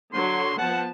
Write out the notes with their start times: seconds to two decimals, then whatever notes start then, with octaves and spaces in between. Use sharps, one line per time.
0.13 D3 F#3 C6
0.58 F3 B3 F#5 A5